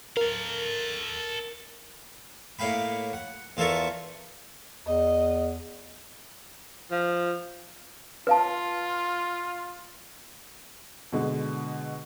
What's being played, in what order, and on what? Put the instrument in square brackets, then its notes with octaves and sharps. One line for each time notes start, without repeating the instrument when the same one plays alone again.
[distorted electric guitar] A4 F5 [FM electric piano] A#4
[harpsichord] A2 A#3 F5 G5 B5
F#5
E2 F4 A4 A#4 E5 C#6
[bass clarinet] E2 [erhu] D#5
[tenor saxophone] F3
[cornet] F4 [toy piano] B4 F5 A5
[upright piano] B2 D3 G#3